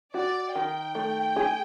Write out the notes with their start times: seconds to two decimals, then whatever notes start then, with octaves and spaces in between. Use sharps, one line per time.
0.14 F#4 D5
0.55 D#3 G5
0.95 A3
1.36 G#4